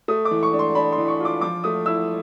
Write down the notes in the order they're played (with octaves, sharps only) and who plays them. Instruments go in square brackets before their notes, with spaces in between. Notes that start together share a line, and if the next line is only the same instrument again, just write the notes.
[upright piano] A3 D#6
D6
E3
C#6
D4
C6
D4 B5
C6
E3
C#6
F4 D6
F3 D6
A3 D#6
E4 E6